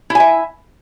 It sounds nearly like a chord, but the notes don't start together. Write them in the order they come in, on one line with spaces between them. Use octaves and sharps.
E4 G#5 E5